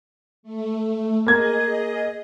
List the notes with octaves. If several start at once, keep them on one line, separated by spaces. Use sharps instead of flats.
A3
A#3 G#4 D#5 G#6